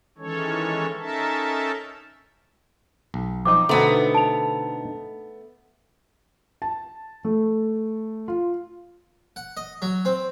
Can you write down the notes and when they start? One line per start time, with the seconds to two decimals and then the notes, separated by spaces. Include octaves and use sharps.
0.18 D#3 E3 G#3 C#4 A4 C#5
0.99 C#4 D#4 A4 A#4 E5 A5
3.14 B1
3.45 F3 C4 D#4 D6
3.69 B2 D3 A3 B3 C4 D#4
4.15 A5 F7
6.62 A5
7.25 A3
8.28 F4
9.36 F#5
9.57 D#5
9.82 F#3
10.05 C4